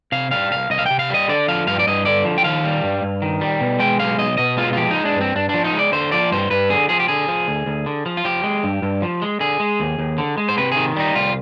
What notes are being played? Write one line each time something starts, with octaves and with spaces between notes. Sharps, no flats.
C3 F5
G3 F5
C2 F5
C2 D#5
F5
C3 G5
F5
G3 D#5
D3 D5
F3 F5
G2 F5
D5
G2 D#5
D3 D5
F3
G5
D#3 F5
G3
G2
G2
D#3
G3
B2
G#3 G5
B1 F5
B1 D#5
B2 D#5
G#3 F4
F4
F3 G4
G#3 D#4
D4
G2 C4
G2 D4
F3 D4
D#4
G#3
D5
D3 C5
F3 D5
G2 C5
G2 B4
D3 G#4
F3 G#4
G4
D3 G#4
F3
D2
D2
D3
F3
F4
F3 G4
G#3
G2
G2
F3
G#3
D3 G#4
G#3
D#2
D#2
D3
G#3
C5
C3 B4
D#3 G#4
G3 D#4
C2 F4